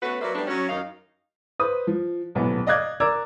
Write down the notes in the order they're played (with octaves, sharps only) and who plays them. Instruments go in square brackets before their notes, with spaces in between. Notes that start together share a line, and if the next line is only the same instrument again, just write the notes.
[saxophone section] A3 B3 C#4 F#4 A4 B4
F#3 A#3 B4 C5 D5 E5
G3 A3 B3 D4
F#3 C#4
F#2 D#3 D#4 F5
[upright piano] B4 C5 D#6
F3
D#1 B1 A2 B3
D5 D#5 F5 D6 F#6 G#6
A#4 D5 A#5 D6 E6 G#6